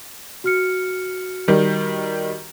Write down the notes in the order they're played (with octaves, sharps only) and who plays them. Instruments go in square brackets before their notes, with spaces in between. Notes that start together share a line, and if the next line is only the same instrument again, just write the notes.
[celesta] F#4 F6 C#7
[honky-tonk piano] D#3 G3